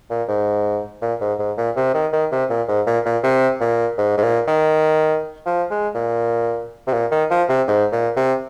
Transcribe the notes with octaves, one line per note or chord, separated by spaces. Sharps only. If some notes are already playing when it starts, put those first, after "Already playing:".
A#2
G#2
A#2
G#2
G#2
A#2
C3
D#3
D#3
C3
A#2
G#2
A#2
A#2
C3
A#2
G#2
G#2
A#2
D#3
F3
G#3
A#2
C3
A#2
D#3
F3
C3
G#2
A#2
C3